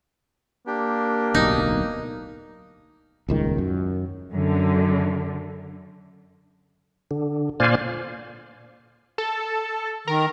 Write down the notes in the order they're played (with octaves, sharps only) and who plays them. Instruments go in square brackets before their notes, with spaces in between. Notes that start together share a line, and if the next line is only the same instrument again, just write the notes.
[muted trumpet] A#3 [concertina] D4 G4
[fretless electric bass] D1 B1 [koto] D#4
[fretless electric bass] D#1 C#2 D#3
F#2
[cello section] F#2 D3
[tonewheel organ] D3
A#2 C5 D5 F5 G#5
[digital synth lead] A4
[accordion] D#3 [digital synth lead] A#4